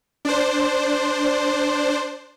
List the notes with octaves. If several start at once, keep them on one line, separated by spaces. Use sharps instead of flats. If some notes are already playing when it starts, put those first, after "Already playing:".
D4 C5